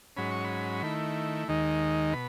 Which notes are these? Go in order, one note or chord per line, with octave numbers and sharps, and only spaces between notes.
G#2 F#3 C#4 B5
C#6
B5
D#3 A3 E4
D#2 D#3 G#3 D#4
B2 B5